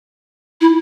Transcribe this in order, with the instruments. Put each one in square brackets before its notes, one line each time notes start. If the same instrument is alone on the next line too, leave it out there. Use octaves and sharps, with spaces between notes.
[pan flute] E4